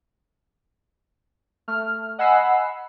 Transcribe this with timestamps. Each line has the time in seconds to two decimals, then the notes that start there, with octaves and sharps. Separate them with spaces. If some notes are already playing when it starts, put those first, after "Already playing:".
1.68 A3 F6
2.18 D#5 F#5 G#5 B5 E6 C7